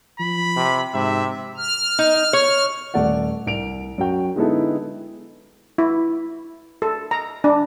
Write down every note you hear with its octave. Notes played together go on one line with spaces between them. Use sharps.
F3 B5
C3
G#2 C3 E5
F6
D#4
C#5
D#1 A3 D5 F#5
C2 D7 F7
F#2 F#4 G5
D3 G#3 B3 D#4 E4 A4
E4
A4
A#5
D4